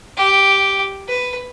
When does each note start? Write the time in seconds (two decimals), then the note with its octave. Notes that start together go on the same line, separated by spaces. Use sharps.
0.17 G4
1.08 B4